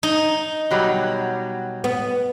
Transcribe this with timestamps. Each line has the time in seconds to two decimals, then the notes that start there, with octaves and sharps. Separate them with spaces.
0.03 D#4
0.71 B2 F#3 G3
1.84 B3